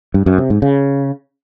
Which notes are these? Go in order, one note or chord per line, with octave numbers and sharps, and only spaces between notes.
G2
F#2
C3
G#2
C#3